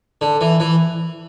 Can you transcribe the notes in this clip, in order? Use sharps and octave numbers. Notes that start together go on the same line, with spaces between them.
D3
E3
E3